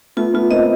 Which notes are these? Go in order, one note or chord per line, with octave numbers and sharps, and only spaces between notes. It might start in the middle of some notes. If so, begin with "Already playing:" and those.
A3 B3 F4
A3 B3 F4
A#3 C4 D#5